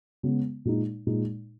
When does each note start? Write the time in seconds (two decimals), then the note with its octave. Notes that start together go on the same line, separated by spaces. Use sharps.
0.23 C#3 G#3 B3
0.65 A#2 G#3 D#4
1.07 A#2 G#3 D#4